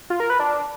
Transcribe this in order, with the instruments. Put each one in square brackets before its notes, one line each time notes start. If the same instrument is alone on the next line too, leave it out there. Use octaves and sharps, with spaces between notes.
[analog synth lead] F4
A#4
B4
D4